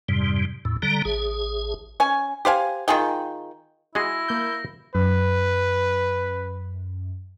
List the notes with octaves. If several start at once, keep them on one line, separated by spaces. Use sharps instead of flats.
F2 G#2 C3 G3
E2 A2
D3 G3 A#5
A1 G#4
C#4 G#5
G4 C5 F5 G#5
D#3 F4 G#4 G5
G#3 E4 F#4 G#4 A#6
A#3 G6
F#2 B4